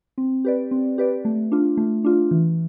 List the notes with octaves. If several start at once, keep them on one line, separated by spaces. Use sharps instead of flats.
C4
G4 B4 D5
C4
G4 B4 D5
A3
D4 F4
A3
D4 F4
E3